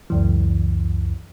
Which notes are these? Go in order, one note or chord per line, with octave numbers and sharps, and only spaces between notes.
C#2 F#2 E3